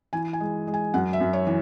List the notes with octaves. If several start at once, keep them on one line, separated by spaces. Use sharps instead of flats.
E3 G#5
G#5
G#3
G#3
G#5
F#2 F#5
E5
F#2
C#5
E3